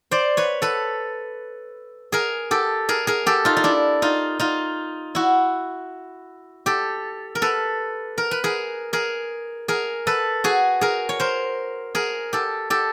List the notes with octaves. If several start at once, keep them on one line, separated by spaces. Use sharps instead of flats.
C5 D5
B4 C#5
A4 B4
G#4 A#4
G4 A4
G#4 A#4
G#4 A#4
G4 A4
D#4 F4
D#4
D4 E4
D#4 F4
D#4 F4
E4 F#4
G4 A4
A#4
A4 B4
A#4
B4
G#4 A#4
G#4 A#4
G#4 A#4
A4 B4
F#4 G#4
G#4 A#4
C#5
A#4 C5
G#4 A#4
G4 A4
G4 A4